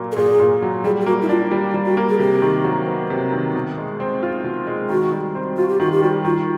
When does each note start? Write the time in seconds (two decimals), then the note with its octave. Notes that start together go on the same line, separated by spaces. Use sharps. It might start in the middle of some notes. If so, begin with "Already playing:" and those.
Already playing: A#2 F#3 A#3
0.12 A4
0.17 A#2 G#4
0.40 A#2
0.62 F#3
0.84 G3 G#4
1.01 G4
1.06 A#3 F#4
1.22 E4
1.29 D4 F4
1.51 G3
1.74 G3
1.86 F#4
1.97 A#3
2.09 G#4
2.19 C3 G4
2.42 D#3
2.64 F#3
2.87 B3
3.10 C3
3.32 D#3
3.55 B2
3.78 G#3
4.00 C4
4.23 F4
4.44 B2
4.67 G#3
4.89 D#3 F#4
5.12 G3
5.35 C4
5.57 F4 F#4
5.69 G4
5.80 D#3 F#4
5.92 G4
6.03 G3 F#4
6.24 D#3 F4